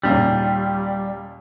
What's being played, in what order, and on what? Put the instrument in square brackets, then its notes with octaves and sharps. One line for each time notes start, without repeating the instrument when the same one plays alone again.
[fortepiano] D#2 A#2 C#3 [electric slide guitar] G3